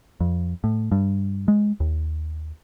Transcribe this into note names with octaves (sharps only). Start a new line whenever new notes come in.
F2
A2
G2
G#3
D#2